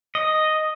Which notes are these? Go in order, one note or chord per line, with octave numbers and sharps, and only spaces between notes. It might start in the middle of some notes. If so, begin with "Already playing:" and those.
D#5